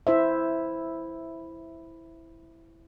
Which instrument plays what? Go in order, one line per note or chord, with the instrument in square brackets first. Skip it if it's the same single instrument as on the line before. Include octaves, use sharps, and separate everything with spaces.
[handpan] E4 C5 E5